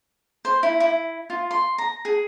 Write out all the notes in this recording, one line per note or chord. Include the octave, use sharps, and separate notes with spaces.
C5
E4
E4
F4
C6
A#5
G#4